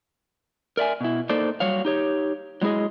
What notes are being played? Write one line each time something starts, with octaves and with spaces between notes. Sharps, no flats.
A#4 D5 E5 G#5
B2 E4
A#3 D#4 A4 C5 D5
F#3 G3 C#5 F5
D#4 G4 C#5
F#3 G#3 E4 G#4 D#5